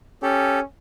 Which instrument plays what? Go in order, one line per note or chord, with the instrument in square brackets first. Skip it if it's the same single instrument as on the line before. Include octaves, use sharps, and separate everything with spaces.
[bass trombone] C#4 [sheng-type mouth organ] G4 A4